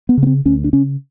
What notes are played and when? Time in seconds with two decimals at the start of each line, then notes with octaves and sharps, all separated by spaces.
0.09 B3
0.17 C#3
0.23 B3
0.27 C4
0.45 D2 C#4
0.64 D4
0.73 C#3 C#4